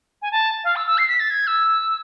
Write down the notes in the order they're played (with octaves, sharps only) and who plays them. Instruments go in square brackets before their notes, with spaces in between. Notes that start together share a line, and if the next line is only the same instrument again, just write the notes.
[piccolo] G#5
A5
F5
E6
E6
C7
B6
A6
G#6
E6